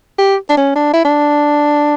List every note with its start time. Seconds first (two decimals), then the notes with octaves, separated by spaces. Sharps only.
0.18 G4
0.49 D4
0.57 C#4
0.75 D4
0.94 E4
1.05 D4